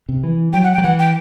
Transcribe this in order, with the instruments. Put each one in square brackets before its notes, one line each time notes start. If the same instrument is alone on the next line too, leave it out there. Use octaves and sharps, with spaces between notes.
[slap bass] C3
E3
[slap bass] F#3 [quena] G5
[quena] F#5
G5
[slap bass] F#3
[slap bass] E3 [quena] F#5
[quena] G5